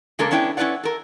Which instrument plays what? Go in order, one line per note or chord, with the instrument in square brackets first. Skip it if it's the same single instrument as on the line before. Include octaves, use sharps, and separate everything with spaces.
[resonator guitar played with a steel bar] C#3 G#3 A#3 D4 A4 A#4
B3 C#4 D4 E4 B4 G5
C#4 E4 F#4 B4 D5 F#5
A4 A#4